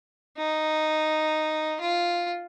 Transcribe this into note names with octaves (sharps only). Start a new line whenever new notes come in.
D#4
F4